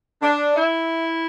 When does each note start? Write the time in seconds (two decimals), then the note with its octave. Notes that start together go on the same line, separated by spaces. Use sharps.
0.23 D4
0.55 E4